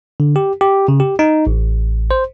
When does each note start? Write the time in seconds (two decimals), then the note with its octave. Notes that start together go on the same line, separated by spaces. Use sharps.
0.20 D3
0.36 G4
0.61 G4
0.88 C#3
1.00 G4
1.19 D#4
1.47 A1
2.11 C5